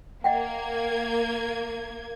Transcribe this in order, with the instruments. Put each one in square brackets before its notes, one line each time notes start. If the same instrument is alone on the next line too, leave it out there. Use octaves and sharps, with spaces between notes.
[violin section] A#3 G#6 [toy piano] D#5 F#5 G5